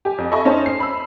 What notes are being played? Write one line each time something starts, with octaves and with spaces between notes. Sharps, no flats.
G4 G#5
F2
A4 D#5 E5 G#5 B5 C#6
C#4 D#4 C5 A5
C7
B5 E6